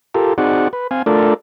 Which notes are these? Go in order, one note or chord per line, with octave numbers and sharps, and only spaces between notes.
F4 G4 A4 A#4
C4 D#4 F#4 G#4 D5 F#5
B4
C4 F5 G#5
A3 D4 F4 A4 A#4 D5